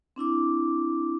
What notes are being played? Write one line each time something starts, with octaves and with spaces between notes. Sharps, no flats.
C4 D4 E4 D6